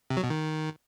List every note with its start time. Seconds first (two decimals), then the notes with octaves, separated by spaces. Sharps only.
0.10 C3
0.17 F#3
0.24 B2
0.30 D#3